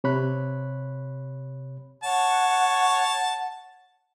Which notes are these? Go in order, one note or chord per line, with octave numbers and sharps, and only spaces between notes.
C3 C#5 B5 F#6
C#5 F#5 A5